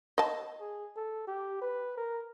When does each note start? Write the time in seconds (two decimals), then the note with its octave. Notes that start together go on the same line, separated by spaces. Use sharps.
0.18 D#5 A5
0.61 G#4
0.97 A4
1.27 G4
1.61 B4
1.98 A#4